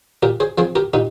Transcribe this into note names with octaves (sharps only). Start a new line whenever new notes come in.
A#2 G4 A#4
G#4 C5
F3 C4 G#4 C5
G4 A#4
A#2 D#4 G4